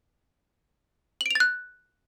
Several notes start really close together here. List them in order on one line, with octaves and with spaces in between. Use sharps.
F#7 D7 F7 A6 F#6